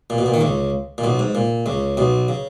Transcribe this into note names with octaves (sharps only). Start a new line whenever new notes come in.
A#2
B2
A#2
D#3
C#2 C#3
A#2
B1 B2
G#2
A#2
C#2 C#3
B1 B2
C#3